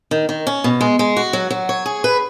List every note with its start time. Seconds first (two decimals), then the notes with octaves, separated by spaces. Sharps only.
0.11 D#3
0.29 D#3
0.47 C#4
0.64 B2
0.81 G#3
0.99 G#3
1.17 F#4
1.33 F#3
1.50 F#3
1.69 C#5
1.86 G#4
2.04 B4